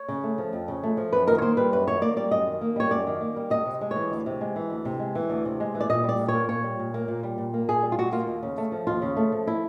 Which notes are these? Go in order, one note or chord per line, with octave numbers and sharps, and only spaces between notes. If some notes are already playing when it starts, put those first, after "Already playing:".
Already playing: C#5
C#3
A3
F3
F2
C#3
A3
F3
F#2 B4
D#3 A#4
C#5
A#3 C5
G3 B4
F#2 B4
D#3 C#5
A#3 D5
G3 D5
F#2 D#5
D#3
A#3
G3 C#5
F#2 D5
D#3
A#3
G3
D2 D#5
C3
G#3
E3 C#5
D2
C3
G#3
E3
D2
C3
G#3
E3
D2
C3
G#3
E3
D5
A#2 D#5
G3 D5
A#2
C#5
A#3
A#2 C#5
G3
A#2
A#3
A#2
G3
A#2
A#3
A#2 G#4
G3
F4
A#2 F#4
A#3 F4
D#2
C#3
A3
F3
D#2 F4
C#3
A3
F3
E4